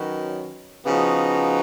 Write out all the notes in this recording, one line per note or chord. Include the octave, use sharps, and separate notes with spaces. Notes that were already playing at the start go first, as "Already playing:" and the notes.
Already playing: D#3 F#3 C#4 F#4 B4
C#3 F3 B3 D#4 F#4